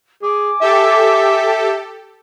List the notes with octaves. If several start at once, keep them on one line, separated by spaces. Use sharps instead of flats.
G#4 G#5 D6
G4 A4 E5